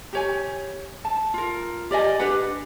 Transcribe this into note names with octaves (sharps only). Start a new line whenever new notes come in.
G4 C#5 G#5
A5
F4 A#4
G4 D5 D#5 G#5
D4 G4 B4 F#5